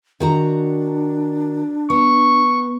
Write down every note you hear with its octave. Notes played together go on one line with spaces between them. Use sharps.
D#3 D4 F#4 A#5
B3 C#6